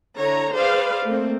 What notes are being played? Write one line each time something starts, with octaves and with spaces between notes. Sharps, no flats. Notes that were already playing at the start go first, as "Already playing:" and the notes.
D3 E4 C#5 A#5
G#4 B4 C5 D5 F5
A3 A#3 C4